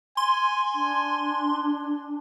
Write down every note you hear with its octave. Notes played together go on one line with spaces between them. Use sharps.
G#5 C6
D4